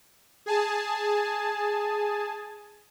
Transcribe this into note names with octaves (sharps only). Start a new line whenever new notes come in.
G#4 G#5 A5